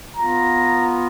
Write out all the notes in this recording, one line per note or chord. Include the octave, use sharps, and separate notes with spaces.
B3 F4 A#5